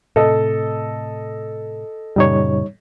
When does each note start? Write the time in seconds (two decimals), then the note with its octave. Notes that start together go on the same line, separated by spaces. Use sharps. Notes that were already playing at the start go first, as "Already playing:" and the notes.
0.16 A2 C3 A4 D#5
2.16 F#2 A#2 C#3 G3 D#4 C#5